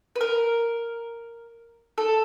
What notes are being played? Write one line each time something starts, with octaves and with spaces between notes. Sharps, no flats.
B4
A#4
A4